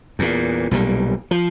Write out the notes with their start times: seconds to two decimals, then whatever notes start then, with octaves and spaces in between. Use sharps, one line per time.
0.19 E2 A#2
0.71 B1 A#2 F3 G3
1.31 F3